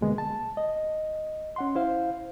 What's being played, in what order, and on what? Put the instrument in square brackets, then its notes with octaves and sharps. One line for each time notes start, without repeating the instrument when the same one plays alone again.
[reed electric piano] D2 B2 D3 G#3 A#3 B3
A5
D#5
C#4 F#5 C6
E4 C5 F5